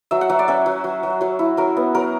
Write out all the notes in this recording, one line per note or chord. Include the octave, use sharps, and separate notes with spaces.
F#3 E5
F#5
F#3 E5
D5
C#4 E5
F#3
F#3
F#3
F#3 C#5
E4
F#3 A#4
B3
F#3 A#4